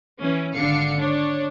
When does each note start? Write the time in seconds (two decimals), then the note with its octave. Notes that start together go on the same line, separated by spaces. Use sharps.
0.20 E3 C#4
0.54 G#1 D3 D4 F5 C#7
0.97 D4 C#5